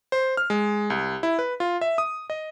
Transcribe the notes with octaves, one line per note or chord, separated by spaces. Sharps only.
C5
F6
G#3
C2
E4
B4
F4
E5
D#6
D#5